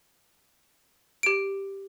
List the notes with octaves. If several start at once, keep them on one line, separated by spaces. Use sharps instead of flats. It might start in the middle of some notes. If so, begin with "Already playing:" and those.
G4 D7